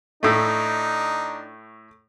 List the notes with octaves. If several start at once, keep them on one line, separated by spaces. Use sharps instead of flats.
A2 A3 D4 D#4